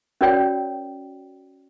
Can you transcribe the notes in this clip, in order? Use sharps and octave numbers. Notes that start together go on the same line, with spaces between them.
C#4 F#4 A#4 C#5 D5 G5